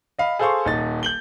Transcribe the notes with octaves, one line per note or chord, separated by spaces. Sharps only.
D#5 F5 B5
G#4 A4 C5 F5 C6 C#6
D#1 D#4 A6
G6 F#7 G7